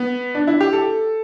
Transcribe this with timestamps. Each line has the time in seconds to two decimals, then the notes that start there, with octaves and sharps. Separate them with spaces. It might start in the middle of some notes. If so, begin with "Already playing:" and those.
Already playing: B3
0.35 D4
0.47 E4
0.61 G4
0.73 A4